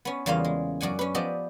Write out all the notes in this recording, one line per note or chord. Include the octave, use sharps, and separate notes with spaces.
B3 C#4
E2 C#3 G3 A#3 F4 F5
G#3
F#2 D5 F#5 G#5
C#4 B4
F3 B3 G4 D5 D#5